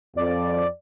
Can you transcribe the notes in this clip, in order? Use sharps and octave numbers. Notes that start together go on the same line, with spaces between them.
F2 D5